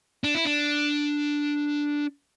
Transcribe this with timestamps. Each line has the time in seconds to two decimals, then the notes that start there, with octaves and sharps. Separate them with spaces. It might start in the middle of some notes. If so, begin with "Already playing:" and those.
0.24 D4
0.35 E4
0.45 D4